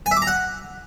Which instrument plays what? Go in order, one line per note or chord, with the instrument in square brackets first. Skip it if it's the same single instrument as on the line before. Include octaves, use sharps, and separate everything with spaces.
[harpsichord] G#5
E5
D6
A#5
F#5